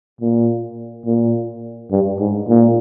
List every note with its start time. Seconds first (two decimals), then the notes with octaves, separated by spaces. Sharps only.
0.21 A#2
1.06 A#2
1.91 G2
2.20 G#2
2.48 A#2